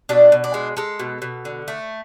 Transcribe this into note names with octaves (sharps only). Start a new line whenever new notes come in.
B2 D4
B2
D4
G#3
G#3 A4
B2
B2
D3
A3